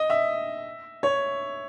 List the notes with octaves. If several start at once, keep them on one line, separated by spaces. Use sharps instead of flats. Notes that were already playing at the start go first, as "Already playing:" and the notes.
Already playing: D#5
E5
C#5